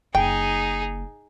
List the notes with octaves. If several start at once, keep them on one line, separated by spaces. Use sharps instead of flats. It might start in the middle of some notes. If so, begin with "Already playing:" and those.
F#1 D#4 G#4 G5